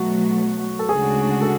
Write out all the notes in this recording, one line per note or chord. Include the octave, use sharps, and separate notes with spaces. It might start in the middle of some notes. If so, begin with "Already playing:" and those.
Already playing: B2 F#3 A3 F#4
A4
D2 C#3 G#3 D4 F#4 G#4
A4